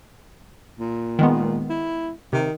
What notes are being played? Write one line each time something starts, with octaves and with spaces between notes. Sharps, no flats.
A#2
D#3 G#3 B3
E4
C3 D#3